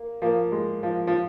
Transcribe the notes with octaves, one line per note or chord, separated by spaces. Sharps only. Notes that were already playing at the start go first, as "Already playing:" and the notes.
Already playing: A#3
F3 A#3
G#3
F3
F3